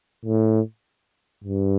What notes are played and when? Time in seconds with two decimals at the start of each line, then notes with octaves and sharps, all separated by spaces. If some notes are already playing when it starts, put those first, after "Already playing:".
0.25 A2
1.44 G2